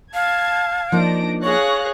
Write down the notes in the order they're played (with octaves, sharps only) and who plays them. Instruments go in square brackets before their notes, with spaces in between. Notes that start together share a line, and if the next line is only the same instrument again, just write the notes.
[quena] F5 [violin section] A5 G#6
[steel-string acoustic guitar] F3 A#3 D#4 [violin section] D4 A#6 D7
[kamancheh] G#4 C#5 [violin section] F5 F#6 A#6 [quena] C#6